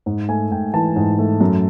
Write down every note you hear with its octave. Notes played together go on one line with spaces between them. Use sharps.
G#2
A3 G#5
G#2 G5
E3 A5
G#2
A3
F#2